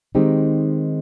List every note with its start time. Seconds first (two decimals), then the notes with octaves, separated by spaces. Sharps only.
0.15 D#3 G#3 C4 D#4 G4